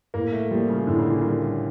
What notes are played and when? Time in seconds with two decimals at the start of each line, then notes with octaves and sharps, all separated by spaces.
0.14 A2 A#3
0.33 A3
0.51 F3 G3 A#3
0.69 C#3
0.87 A2 D3
0.98 C#3
1.09 A#2
1.21 C#3 G3 A#3